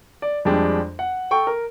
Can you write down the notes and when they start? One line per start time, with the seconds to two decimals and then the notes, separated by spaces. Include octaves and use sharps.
0.22 D5
0.45 F2 G3 G#3 D4
0.99 F#5
1.31 A4 G5 C#6
1.47 A#4